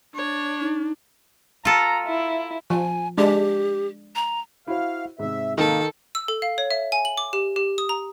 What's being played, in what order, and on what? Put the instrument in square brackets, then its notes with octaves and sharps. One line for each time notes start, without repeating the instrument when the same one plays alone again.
[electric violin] D4 [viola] C#5
[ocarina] D#4
[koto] F4 A4 [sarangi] A#5
[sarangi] E4
[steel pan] F3 [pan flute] G#5
[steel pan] G#3 D4 [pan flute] G4
[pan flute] A#5
[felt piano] E4 F#4 C5 [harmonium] F5
[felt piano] G#2 C3 [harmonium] E5
[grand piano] D#3 [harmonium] A#3 [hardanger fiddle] A4
[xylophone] E6
A4
F5
C#5
E5
G#5
F#7
D6
G4
G4
D#6
A#5